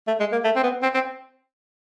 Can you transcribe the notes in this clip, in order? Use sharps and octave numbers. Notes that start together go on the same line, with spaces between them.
A3
G#3
A#3
A3
C4
B3
C4
C4